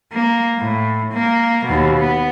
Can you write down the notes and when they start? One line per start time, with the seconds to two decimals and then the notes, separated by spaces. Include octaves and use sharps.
0.12 A#3
0.58 A2
1.12 A#3
1.66 D#2 B2
1.97 B3